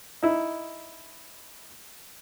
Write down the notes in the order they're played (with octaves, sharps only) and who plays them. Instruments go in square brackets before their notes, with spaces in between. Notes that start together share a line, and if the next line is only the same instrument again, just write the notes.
[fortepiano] D#4 E4